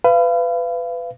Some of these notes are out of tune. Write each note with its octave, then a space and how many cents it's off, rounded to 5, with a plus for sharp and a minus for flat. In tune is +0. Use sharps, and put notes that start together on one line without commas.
B4 +20 F5 -35